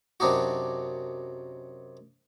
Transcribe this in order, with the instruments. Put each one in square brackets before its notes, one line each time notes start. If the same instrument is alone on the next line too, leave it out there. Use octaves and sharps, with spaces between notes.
[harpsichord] F#2 C3 D4 D#4 F#4